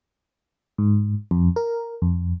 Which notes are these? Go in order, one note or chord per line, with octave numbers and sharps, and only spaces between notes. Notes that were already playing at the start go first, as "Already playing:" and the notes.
G#2
F2
A#4
F2